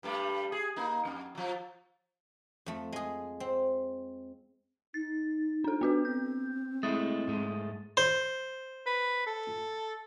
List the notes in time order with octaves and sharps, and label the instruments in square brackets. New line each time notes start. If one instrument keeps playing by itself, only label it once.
[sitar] G2 G3 A3
G#4
A#3 D#4
F2
F3 F#3
[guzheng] F2 A3
G#3 G#4
C4
[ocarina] D#4 [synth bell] A6
[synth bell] D4 A4
[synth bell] B3 F#4 B4 [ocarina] D4
[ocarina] C4 [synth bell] G6
[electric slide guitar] G#3 A3 E4 [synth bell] D#6 A6
[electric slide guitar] G#2 G#3 A3
[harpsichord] C5
[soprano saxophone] B4
A4